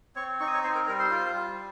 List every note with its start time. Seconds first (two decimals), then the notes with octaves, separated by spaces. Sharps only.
0.16 C4 C#5 C#6
0.40 D#4 C#6
0.47 D#6
0.54 C#5 C#6
0.63 C4 C5 C6
0.75 A#4 A#5
0.87 G3 A#4 A#5
0.99 C5 C6
1.11 F4
1.35 G3